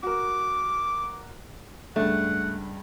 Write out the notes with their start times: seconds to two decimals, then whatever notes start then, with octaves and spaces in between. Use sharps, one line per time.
0.03 F#4 A#4 D6
1.96 C#2 G2 A3 F#5